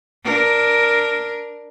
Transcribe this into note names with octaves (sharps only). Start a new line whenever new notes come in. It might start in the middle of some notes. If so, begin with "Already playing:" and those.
D4 A#4